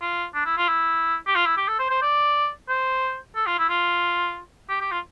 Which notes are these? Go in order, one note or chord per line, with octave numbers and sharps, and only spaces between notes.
F4
D4
E4
F4
E4
G4
F4
E4
G4
A4
C5
C5
D5
C5
A4
F4
E4
F4
G4
G4
F4